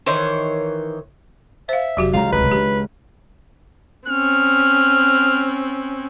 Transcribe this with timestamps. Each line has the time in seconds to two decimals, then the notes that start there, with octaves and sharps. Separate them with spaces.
0.06 D#3 E3 C5 C#5
1.69 C5 E5 F5
1.97 F1 F#3 F#4 G4
2.13 C#2 E3 F3 F5 A#5
2.33 D1 C2 B4
2.51 D#2 D4 G4
4.08 C4 C#4 F6